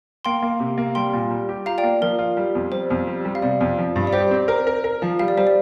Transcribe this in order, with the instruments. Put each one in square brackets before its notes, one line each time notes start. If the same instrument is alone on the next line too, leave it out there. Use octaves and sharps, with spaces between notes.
[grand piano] A#3 [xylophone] G5 C6
[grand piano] A#3
C3
A#3
[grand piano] G3 [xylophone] G5 C6
[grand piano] A#2
G3
G4
[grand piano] F4 [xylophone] F5 A#5
[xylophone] D5 G5
[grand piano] A#3
[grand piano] F3 [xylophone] A#4
[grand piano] F4
G3
F2
[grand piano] G3 [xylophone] C5
[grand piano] F2
G3
G3
[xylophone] F5
[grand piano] C3 [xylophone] D5
[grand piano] F2
F3
G2
[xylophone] D5
[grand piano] G4 [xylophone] C5
[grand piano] C4
[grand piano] A#4 [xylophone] C5
[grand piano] A#4
A#4
F3
[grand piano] G3 [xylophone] F5
[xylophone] D5
[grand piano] G3 [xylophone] C5
[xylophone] D5